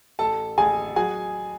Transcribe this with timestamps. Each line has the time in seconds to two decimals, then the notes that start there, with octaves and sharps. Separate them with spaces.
0.19 A1 A4 A5
0.58 A1 G#4 G#5
0.96 F#3 G#4 G#5